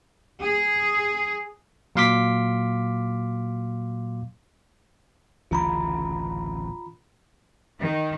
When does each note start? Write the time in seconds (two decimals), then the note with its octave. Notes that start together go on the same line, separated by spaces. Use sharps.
0.41 G#4
1.96 A#2 F#3 F5 C6 D6 B6
5.51 D1 A1 C#3 F4 A#5 B5
7.79 D#3